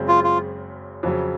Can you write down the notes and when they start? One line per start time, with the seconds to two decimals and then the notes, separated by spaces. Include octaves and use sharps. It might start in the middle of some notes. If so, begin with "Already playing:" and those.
Already playing: F#1 F#2 C#3 G#3 C4
0.08 F4
0.24 F4
1.03 F2 C#3 F#3